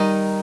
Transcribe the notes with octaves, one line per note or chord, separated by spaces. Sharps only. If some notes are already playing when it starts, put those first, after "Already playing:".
Already playing: D#3 G3 D#4